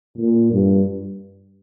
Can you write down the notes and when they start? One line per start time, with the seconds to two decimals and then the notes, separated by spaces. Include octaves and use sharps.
0.18 A#2
0.52 G2